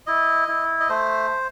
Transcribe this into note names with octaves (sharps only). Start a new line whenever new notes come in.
E4 D#5
E4
D#5
A3 C5